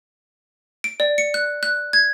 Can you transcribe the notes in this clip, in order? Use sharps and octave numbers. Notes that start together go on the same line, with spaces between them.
D7
D5
C#7
F#6
F#6
G#6